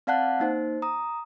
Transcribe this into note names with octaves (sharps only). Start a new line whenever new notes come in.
C4 D5 F5 F#5 A5 F#6
A#3 D#4 C5
A#5 D#6